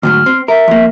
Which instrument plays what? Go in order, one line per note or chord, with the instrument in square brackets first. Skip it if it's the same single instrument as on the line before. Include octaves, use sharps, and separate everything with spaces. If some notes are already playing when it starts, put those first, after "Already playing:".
[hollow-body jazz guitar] D2 G#2 F#3 [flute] F6
[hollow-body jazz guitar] C4
[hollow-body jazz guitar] A#4 [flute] E5
[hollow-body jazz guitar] F2 A#3